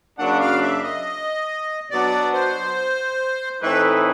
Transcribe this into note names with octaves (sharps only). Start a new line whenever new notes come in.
F#2 C#3 F#3 A#3 D4 F#5
F5
E5
D#5
B2 F#3 B3 D4 D5
C5
A2 E3 A3 C4 D#4 B4